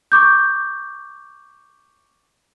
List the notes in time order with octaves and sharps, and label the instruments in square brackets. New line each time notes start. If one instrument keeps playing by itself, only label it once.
[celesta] C#6 D6 G6